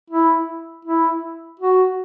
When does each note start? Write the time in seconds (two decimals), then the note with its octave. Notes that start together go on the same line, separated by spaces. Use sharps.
0.10 E4
0.85 E4
1.60 F#4